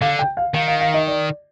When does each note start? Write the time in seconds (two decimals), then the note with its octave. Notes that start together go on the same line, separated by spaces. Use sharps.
0.01 D3 F5
0.19 G5
0.37 F5
0.54 D#3 F5
0.68 F5
0.81 F5
0.94 D#5
1.07 D5